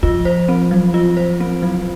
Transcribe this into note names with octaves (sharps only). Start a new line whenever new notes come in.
F3 F4
C5
C4
F#3
F4
C5
C4
F#3